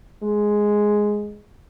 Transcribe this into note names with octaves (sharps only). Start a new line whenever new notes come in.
G#3